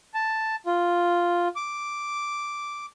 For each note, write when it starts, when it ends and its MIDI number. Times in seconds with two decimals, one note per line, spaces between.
0.14 0.56 81
0.66 1.48 65
1.56 2.86 86